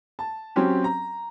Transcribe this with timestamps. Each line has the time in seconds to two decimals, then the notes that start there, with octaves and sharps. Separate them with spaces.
0.19 A5
0.56 F#3 C4 C#4 G4
0.84 A#5